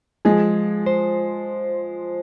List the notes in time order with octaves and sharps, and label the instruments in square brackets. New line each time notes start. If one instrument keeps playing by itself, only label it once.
[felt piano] F3 G#3 [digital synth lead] G#4
[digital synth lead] C5